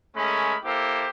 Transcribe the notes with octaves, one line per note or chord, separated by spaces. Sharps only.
G#3 A3 C#4 A#4 B5
A#3 E4 G4 A4 C5